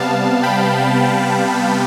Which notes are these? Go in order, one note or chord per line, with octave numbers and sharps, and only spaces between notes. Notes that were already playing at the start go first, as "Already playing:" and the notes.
Already playing: C3 G3 B3 F5 A5
G5 B5